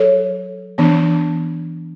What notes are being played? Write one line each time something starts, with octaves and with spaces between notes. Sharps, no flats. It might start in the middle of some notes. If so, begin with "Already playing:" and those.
Already playing: F#3 A4 C#5
E3 B3 D4